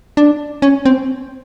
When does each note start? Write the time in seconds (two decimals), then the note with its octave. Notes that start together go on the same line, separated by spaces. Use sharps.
0.17 D4
0.62 C#4
0.85 C4